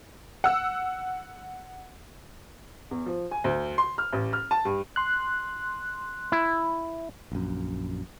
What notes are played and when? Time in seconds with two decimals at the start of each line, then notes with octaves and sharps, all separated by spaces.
0.44 F#5 E6
2.91 E2
3.06 F3
3.31 G#5
3.44 D2
3.78 C6
3.98 F6
4.13 A1
4.33 F6
4.51 A5
4.65 G2
4.96 C6 F#6
6.32 E4
7.32 A#1 F#2